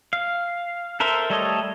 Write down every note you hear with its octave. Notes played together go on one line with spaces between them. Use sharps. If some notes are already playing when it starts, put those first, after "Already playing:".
F5
A4 A#4 C5 E5
G3 A3 A4 C#5 D#5